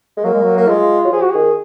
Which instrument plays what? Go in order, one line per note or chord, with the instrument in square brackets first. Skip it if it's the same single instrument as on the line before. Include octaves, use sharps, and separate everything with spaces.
[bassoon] G#3
[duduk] F#3 [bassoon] A#3
[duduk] G#3
F#3
[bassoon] A#3
[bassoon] G#3 [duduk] F4
[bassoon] F#3
[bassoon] F3 [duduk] G#4
[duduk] F#4
[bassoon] D#3 [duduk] G#4